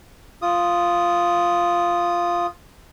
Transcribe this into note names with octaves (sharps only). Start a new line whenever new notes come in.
F4 D#6